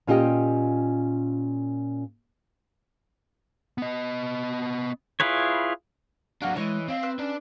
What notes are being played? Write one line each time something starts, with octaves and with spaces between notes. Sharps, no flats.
A#2 C#4 F4 G4 D#5 G5
B3 D#5
E4 F4 G#4 B4 C#5
F#3 A#3 D4 F#4
E3 G#3 C#5 D#5
C4 F5
B4 E6
C#4 D4 D5